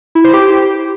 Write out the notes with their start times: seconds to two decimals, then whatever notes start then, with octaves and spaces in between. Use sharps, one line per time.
0.15 E4
0.24 C5
0.33 G4